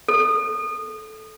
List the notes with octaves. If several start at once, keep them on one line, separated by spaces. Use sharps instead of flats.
A4